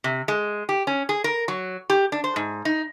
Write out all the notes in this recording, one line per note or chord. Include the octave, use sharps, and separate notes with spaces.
C3
G#3
G4
C#4
G#4
A#4
F#3
G4
D4
C5
G#2
D#4